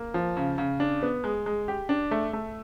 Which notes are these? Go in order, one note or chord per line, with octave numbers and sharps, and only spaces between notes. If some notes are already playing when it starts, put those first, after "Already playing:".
Already playing: A#3
F3
C#3
C#3
D4
B3
G#3
G#3
G4
D4
A3
A3